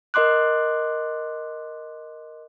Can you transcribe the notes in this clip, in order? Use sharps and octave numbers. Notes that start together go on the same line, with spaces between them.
A#4 D#5 C6 D6 F#6